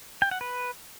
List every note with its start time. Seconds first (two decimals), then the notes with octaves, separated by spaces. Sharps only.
0.22 G5
0.31 F#5
0.41 B4